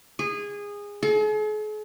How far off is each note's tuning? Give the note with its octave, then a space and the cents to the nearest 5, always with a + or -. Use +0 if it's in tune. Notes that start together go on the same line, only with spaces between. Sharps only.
G#4 -20
G#4 +45